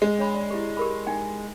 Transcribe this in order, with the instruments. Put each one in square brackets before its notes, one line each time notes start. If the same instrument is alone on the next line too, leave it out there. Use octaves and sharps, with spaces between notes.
[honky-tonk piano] G#3
[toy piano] D4 C#5 B5
D5
E4 G4
G4 A#4 B5
D#4 G5 G#5